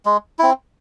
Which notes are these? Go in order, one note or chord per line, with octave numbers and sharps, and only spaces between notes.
G#3
C4 E4